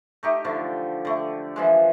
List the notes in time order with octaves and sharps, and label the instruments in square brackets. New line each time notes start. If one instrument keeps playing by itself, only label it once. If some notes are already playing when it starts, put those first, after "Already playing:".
[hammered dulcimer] A3 D#4 G4
D3 F3 A3
D3 A3
E3 F3 G#3